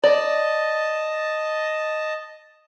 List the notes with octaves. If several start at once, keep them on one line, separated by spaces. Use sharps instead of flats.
D5 D#5 A5